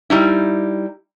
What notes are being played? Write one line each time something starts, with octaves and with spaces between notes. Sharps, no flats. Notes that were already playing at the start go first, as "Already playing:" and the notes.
G3 D#4 E4